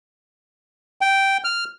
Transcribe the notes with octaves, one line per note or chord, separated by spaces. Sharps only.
G5
F6